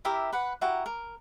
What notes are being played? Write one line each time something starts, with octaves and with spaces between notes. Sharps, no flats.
E4 G4 A#4 E5
B4 F#5
E4 F#4 G4 A#5
A#4